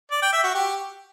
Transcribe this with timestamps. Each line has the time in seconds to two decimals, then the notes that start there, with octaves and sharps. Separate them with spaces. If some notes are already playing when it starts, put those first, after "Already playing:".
0.11 D5
0.22 G5
0.33 E5
0.44 F#4
0.55 G4